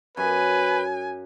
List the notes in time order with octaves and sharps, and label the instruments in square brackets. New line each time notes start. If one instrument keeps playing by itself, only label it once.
[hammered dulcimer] F#2 [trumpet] B4 [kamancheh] G#5